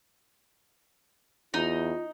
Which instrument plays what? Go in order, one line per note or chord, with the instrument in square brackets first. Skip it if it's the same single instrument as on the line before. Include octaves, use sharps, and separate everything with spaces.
[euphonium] E2 [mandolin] D#4 [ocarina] F4